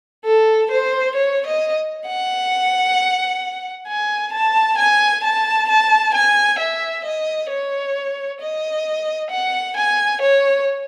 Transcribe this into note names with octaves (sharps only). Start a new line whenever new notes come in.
A4
C5
C#5
D#5
F#5
G#5
A5
G#5
A5
A5
G#5
E5
D#5
C#5
D#5
F#5
G#5
C#5